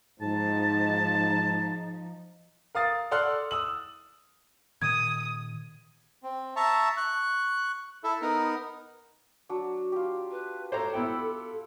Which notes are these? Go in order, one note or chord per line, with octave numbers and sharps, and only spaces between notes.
G#2 F3 D#4 A5
A#4 F5 D#6 A6
A4 D5 F#5 C6 F6 F#6
D#6 E6 F#7
A#2 D#3 D#6 G#6
C4
E5 A5 A#5 C#6
C#6 F#6
E4 A4 E5
B3 D#4 A#4
F#3 D4
F4 G4
B4
A4 C5 C#5 A#5 D6
B3 E4 G5